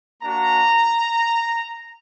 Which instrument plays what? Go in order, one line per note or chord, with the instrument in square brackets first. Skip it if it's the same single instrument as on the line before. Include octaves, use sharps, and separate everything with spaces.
[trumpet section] A#3 D4 F#4 A#5